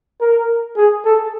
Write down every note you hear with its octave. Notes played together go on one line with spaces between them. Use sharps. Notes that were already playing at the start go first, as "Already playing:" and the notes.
A#4
G#4
A4